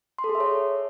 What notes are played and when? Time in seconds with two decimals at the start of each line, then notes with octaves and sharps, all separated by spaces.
0.18 C6
0.24 A4
0.29 G#4
0.35 E5
0.40 C#5